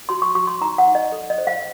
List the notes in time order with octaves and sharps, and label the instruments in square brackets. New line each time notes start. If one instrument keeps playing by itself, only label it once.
[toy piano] F#4 C6
C#6
F#4 C#6
C6
D#4 A#5
F#5
D#4
D#5
A4
D#5
C5
F5